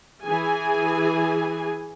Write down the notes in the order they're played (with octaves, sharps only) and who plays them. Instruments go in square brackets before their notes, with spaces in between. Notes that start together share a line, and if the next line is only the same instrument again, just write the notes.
[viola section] E3 G#4 G#5